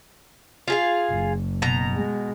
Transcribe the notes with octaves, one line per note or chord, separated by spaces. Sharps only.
F4 G#4 F5
F#1
B2 A#5
G#3